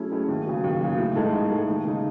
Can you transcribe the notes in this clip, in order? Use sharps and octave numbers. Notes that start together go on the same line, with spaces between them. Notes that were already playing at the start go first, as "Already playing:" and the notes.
Already playing: F#3 A3 C#4 E4 G#4
A3 C#4 E4 G#4
D#2
C#3 F#3
D#2
C#3 F#3
A2
G#3 D#4 A4
A2
G#3 D#4 A4
D#2
C#3 G#3 D#4